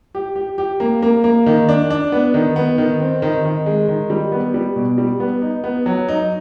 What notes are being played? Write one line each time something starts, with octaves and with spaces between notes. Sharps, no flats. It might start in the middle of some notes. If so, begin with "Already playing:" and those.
G4
G4
G4
A#3
A#3
A#3
D#3
D4
D4
B3
D#3
B3
D#3
C4
D#3
D#3
G#3
D#3
G3
B3
G3
B2
G3
B3
D#4
B3
F#3
D#4